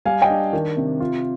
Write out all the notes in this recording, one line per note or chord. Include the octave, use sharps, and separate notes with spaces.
G3 F5 G#5
D#5 G5
D4
D#3
C3
F4